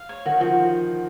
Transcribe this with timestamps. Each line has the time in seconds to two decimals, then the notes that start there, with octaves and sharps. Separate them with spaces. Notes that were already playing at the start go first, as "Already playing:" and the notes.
Already playing: F5
0.09 C#5
0.26 D#3 F#4
0.40 F3 F#4